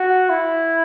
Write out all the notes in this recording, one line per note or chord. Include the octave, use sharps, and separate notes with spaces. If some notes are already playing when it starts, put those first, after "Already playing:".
Already playing: F#4
E4